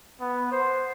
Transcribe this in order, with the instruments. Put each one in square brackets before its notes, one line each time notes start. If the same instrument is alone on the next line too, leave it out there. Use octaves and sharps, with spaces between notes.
[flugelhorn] B3
C5